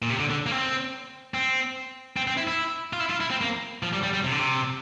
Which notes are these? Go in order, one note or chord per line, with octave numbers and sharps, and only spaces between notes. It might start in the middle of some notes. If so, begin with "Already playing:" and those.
A#2
C3
D3
D3
A#3
C4
C4
C4
C4
E4
E4
F4
E4
F4
E4
C4
A#3
F3
G3
G3
G3
C3
D3
C3